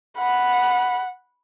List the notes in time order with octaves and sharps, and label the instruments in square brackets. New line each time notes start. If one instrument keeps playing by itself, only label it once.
[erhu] F#5 [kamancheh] B5